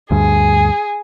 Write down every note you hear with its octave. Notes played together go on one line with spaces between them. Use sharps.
D2 G2 G#4